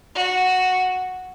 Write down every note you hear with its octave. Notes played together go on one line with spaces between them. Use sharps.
F#4